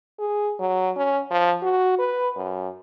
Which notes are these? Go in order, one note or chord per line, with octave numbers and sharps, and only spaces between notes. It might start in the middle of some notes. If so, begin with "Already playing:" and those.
G#4
F#3
C#4
F3
F#4
B4
F#2